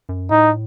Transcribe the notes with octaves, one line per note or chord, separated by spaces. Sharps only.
F#2
A2 D#4